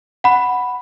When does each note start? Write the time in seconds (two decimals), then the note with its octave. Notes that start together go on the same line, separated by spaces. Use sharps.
0.24 F#5 B5